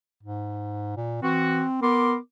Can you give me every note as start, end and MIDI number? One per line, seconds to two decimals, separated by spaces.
0.23 0.93 44
0.97 1.20 46
1.22 1.62 52
1.22 1.78 60
1.22 1.62 66
1.82 2.17 59
1.82 2.14 70
1.82 2.14 84
1.82 2.14 86